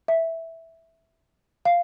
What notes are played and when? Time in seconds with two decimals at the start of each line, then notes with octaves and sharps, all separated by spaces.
0.08 E5
1.65 F5